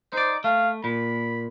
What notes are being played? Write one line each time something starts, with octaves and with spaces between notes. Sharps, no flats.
D#4 C5 D5
A3 F5
A#2 B5